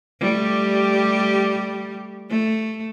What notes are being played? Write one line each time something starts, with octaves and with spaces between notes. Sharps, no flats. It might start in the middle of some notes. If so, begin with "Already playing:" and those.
G3 A3 G4
A3